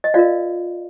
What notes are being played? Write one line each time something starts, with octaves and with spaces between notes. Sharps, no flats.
D#5
F4 A#4 D5 F5